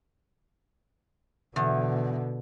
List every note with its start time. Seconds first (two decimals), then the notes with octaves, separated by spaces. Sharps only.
1.56 E2 B2 D3